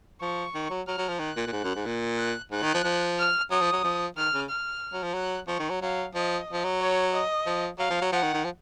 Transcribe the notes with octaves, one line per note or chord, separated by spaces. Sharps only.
F3 C#6
D#3
F#3
F#3 F6
F#3
F3
D#3 F#6
A#2
A#2
G#2
F#2
G#2
A#2
F#6
G#2 F#6
D#3
F3
F3
F6
F#3 D#6
F3
F#3
F3
D#3 F6
C#3
F6
F#3
F3
F#3 F#6
F3 C#6
D#3
F#3
F#3 F5
F3 D#5
F3
F#3
C#5
D#5
F3
F#3 F5
F3
F#3
F3 F#5
D#3
D#3
F3